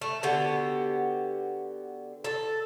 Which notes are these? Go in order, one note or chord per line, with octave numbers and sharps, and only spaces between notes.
A3
D3 B3 F#4 G4
A4